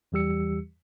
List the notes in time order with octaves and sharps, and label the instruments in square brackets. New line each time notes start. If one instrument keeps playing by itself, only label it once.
[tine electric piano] E2 E3 G3 G4 E6 C#7